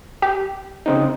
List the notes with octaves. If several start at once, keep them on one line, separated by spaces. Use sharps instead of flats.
G4
C#3 C4 D#4